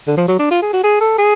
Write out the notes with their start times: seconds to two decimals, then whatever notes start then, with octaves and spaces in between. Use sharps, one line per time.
0.07 D3
0.17 F3
0.28 F#3
0.39 D4
0.51 F4
0.62 G#4
0.73 F#4
0.83 G#4
1.01 A4
1.18 G#4